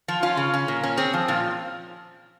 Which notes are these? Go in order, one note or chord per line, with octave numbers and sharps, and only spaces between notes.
F3 F4
C#4 F4
C#3
C#4
A#2
C#4
C4 G#4
F3
A#2 F4